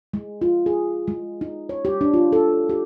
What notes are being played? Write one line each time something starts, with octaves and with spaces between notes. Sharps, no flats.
G#3
F4
G#4
G#3
D#4
C#5
G4
D4
F4
A4
G4